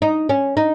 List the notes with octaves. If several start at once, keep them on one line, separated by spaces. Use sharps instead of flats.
D#4
C#4
D#4